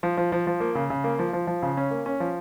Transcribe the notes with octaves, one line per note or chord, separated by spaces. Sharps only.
F3
F3
F3
F3
A#3
C#3
C#3
A#3
F3
F3
F3
C#3
C#4
A#3
C#4
F3